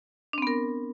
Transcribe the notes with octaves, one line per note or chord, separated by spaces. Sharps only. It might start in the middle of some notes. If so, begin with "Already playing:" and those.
B3 C4 D4 A#4